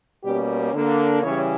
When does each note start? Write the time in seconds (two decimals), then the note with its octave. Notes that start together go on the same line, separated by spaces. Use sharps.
0.23 B2 G3 A#3 C#4 G4
0.74 D3 A#3 D4
1.22 C#3 E3 G3 C#4 C#5